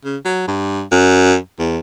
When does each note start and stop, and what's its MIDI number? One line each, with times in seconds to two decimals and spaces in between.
0.05 0.17 49
0.25 0.46 54
0.48 0.82 43
0.92 1.36 42
1.59 1.79 40